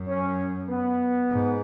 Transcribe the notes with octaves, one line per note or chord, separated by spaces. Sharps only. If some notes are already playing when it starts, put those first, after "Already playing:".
Already playing: F#2
C#4
B3
G#2